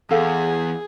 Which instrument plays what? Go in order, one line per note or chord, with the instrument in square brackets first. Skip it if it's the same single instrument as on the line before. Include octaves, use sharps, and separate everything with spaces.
[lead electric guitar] E2 [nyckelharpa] G#4 [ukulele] A4 F5 F#5